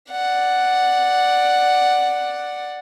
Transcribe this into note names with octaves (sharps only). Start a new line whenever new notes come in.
D5 F#5